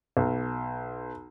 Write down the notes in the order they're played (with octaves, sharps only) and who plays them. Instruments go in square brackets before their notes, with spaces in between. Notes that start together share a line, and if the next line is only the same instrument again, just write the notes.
[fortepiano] B1